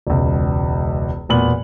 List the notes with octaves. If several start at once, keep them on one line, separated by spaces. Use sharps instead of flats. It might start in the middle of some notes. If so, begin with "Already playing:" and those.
E1 C#2
E1 A#2 B3 F#7